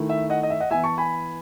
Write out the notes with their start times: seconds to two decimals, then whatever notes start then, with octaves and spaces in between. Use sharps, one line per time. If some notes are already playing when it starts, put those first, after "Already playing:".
Already playing: D#3 A3 E4
0.09 E5
0.30 D#5 F#5
0.43 D#5
0.50 E5
0.60 D#5 F#5
0.70 E3 B3 E4 E5 G#5
0.84 A5 C#6
0.98 G#5 B5